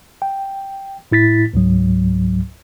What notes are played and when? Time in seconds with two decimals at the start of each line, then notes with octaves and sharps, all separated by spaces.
0.22 G5
1.11 A2 E4 A6 B6
1.54 C#2 G#2 F#3